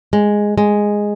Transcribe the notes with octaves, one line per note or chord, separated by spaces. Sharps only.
G#3
G#3